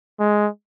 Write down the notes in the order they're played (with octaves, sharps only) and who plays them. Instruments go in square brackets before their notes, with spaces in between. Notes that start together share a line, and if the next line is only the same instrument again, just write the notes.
[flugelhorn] G#3